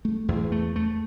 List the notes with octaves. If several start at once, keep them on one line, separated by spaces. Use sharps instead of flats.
A3
E2
A3
A3